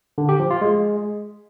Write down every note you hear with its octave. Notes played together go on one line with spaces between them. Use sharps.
D3
G4
F3
F4
G#3